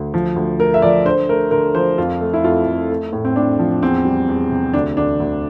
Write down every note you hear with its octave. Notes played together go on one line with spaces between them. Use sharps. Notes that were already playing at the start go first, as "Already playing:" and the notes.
Already playing: D2
F3
D2
A3 A#4
E5
F3 D5
D3 C5
A3 A#4
D3 A#4
F3 C5
F2 F4
A3
E4
F2 F4
F2
A3
A2
C4
A2 D4
F3
E2 C4
G3
E2
C3
D2 D4
D2 D4
D2